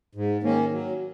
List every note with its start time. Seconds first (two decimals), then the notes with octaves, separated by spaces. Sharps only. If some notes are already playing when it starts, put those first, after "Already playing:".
0.15 G#2
0.43 D#3 A#3 C#4
0.71 F#3